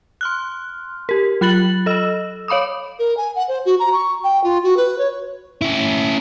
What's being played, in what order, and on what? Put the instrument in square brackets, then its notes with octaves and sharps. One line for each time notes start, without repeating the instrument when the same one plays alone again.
[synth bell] C6 F6 F#6
G4 A#4
F#3 F4 B5 F#6 A6 F#7
A4 D#5 E6
C#5 F5 B5 D6 D#6
[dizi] A#4
G#5
F#5
C5
F#4
A#5
C#6
G5
F4
F#4
B4
C#5
[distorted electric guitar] C#4 E4